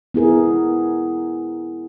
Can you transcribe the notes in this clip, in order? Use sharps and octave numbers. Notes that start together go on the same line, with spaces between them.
B3 E4 G#4 A#4